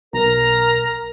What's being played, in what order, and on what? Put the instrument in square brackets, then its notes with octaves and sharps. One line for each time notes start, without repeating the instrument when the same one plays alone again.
[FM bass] B1 [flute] A#4 [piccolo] A#5